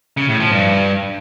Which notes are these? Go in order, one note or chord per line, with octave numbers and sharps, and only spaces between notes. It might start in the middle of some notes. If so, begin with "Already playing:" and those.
C#3
A2
F3
G2